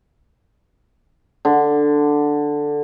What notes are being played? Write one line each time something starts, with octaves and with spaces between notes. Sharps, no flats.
D3